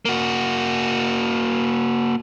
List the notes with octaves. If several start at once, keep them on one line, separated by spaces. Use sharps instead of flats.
A#3 F#4